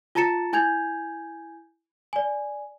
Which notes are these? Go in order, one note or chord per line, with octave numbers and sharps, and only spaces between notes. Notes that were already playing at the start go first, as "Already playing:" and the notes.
F4 A5 A#5 A6 C#7 E7
E4 G#5 G6 G#6 F7
D5 G#5